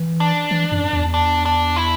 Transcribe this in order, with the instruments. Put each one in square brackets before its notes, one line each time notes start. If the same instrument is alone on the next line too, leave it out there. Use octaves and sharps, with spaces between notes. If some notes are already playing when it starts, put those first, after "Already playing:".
Already playing: [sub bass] E3
[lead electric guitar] D4
[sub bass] E3
F#2
E2
[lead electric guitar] D4
D4
E4